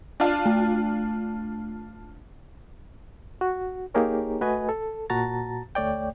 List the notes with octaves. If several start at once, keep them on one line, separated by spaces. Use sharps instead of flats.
D4 F4
A3
F#4
A#3 D#4 G4 G#4 A#4 C#5
A3 F#4 B4 D#5 G#5
A4
A#2 F#4 A5 A#5 A6
D2 A3 C#5 D5 G5